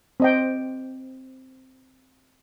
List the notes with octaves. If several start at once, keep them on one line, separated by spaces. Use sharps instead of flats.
C4 D#5 G5